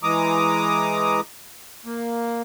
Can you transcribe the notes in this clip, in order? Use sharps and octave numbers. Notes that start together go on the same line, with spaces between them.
E3 G#3 A#5 D6 D#6
A#3